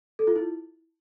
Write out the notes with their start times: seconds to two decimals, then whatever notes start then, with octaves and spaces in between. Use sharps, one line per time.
0.19 A4
0.27 F4
0.36 E4